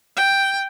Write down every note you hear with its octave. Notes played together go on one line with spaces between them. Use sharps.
G5